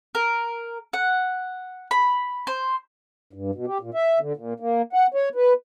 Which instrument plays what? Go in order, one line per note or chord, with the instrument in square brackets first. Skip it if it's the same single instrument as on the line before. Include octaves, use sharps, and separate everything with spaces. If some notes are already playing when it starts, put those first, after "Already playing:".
[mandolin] A#4
F#5
B5
C5
[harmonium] G2
B2
G4
A#2
E5
D3
A#2
A#3
F#5
C#5
B4